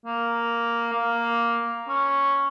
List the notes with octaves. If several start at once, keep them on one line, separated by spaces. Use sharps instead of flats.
A#3
A#3
C#4